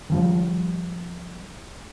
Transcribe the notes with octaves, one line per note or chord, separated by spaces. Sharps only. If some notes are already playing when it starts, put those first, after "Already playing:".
D#3 F3 G3